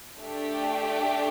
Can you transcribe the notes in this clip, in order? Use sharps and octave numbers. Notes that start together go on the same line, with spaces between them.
A3 D4 G4